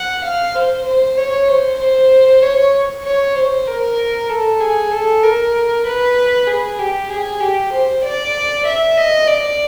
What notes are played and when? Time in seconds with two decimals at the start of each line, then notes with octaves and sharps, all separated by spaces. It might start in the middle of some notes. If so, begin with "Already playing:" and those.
Already playing: F#5
0.24 F5
0.55 C5
0.86 C5
1.17 C#5
1.48 C5
1.79 C5
2.42 C#5
3.04 C#5
3.35 C5
3.67 A#4
4.29 A4
4.60 G#4
4.91 A4
5.23 A#4
5.86 B4
6.47 G#4
6.79 G4
7.10 G#4
7.41 G4
7.72 C5
8.04 D5
8.65 E5
8.97 D#5
9.28 D5